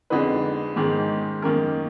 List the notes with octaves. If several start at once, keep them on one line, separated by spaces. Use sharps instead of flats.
F2 D3 G#3 D#4 B4
G#2 D#3 G#3
F#2 D#3 A#3 A#4